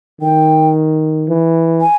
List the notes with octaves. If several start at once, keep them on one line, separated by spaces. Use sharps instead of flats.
D#3 G5
E3
G#5